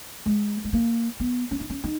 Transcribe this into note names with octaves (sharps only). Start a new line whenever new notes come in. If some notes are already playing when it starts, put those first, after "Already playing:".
G#3
G#3
A#3
B3
C#4
D#4
C#4
D#4